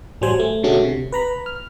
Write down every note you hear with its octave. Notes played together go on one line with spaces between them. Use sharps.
A1 F#3 G3 C5 G#5
A3
B2 D3 G#3 A3 C#4 F#4
C3
B4 A#5 B5
F6